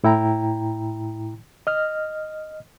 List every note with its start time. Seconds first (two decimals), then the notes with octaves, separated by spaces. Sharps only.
0.04 A2 E4 G5 A#5
1.67 D#5 F6